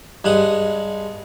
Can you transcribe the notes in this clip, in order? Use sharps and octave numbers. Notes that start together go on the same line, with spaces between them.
G2 G#3 F#5 D#6